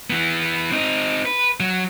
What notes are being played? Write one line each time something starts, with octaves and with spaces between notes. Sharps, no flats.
E3 B3
C4 D#4
B4
F#3